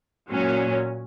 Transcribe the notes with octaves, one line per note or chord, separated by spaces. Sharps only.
A#2 F#3 C#4